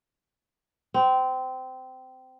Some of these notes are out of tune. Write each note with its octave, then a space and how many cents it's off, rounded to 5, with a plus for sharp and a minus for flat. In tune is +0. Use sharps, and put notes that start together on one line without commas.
C4 -20